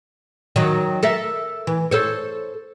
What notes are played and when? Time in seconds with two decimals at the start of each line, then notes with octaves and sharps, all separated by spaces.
0.56 D#3 F#3
1.03 A4 A#4 E5
1.67 E3
1.91 A4 C5 C#5